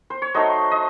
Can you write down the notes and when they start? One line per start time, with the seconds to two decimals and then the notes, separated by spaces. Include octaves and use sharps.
0.10 C5
0.22 C#5
0.34 F#3 A3 D#4 C5 D#5
0.71 C5 D#5